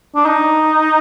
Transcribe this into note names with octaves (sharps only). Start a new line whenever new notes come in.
D4
D#4